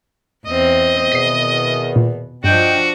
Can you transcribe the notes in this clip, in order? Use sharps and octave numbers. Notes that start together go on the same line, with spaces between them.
E2 C4 D#5
E2 B2 D#3 B6 C7
A#2
G2 F3 D4 F#4 D#5 G5